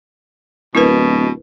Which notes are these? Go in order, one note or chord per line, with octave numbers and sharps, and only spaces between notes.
D1 B2 E4 A#4 B4